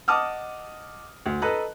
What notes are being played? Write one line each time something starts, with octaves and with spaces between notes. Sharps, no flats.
D#5 F#5 A5 D6 D#6 F6
D2
A4 B4 D#5 A#5 F#6